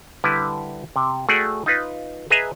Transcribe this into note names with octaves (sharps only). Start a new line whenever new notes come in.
D3 G3 E4 B4
C3
A3 F#4 G#4 D5 G5
D#4 F4 B4
G#4 B4 D#5 E5 A#5